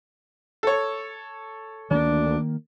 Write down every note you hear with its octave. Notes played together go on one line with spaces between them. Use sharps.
A4 C#5
D2 D#3 A#3 D4